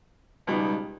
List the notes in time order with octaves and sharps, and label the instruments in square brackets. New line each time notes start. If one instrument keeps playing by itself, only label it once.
[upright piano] C#2 B2 G3 B3 D#4